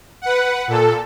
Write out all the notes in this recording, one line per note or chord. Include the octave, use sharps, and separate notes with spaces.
B4 F#5
A#2 A4